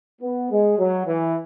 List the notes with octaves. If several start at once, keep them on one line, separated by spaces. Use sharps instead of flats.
B3
G#3
F#3
E3